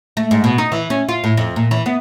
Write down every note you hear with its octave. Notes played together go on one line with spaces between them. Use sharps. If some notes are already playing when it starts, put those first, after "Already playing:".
A3
G#2
B2
D#4
E3
C#4
F4
A2
F2
A#2
E3
B3